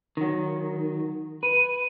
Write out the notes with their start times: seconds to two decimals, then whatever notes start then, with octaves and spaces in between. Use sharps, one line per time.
0.17 D#3 F#3
1.43 B4 D#7